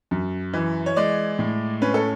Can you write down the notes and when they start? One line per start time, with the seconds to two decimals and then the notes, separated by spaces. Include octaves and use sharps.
0.11 F#2
0.54 E3
0.86 C#5
0.96 G#3 D5
1.39 A2
1.82 C#4 B4
1.94 A4